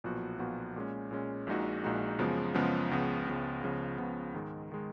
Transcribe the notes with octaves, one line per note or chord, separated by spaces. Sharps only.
B1 A#2 F3 B3 F#4
B1 A#2 F3 B3 F#4
A#2 G#3 C#4
A#2 G#3 C#4
A#1 A#2 G#3 D#4 F#4
A#1 A#2 G#3 D#4 F#4
F#2 C#3 F3 G#3 B3
F#2 C#3 F3 G#3 B3
C#2 C#3 F3 B3
C#2 C#3 F3 B3
C#2 C#3 F3 B3
C#2 C#3 F3 B3
G#2 D#3 G#3
D#3 G#3